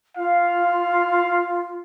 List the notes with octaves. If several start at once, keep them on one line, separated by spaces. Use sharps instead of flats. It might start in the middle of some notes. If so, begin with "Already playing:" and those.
F4 F5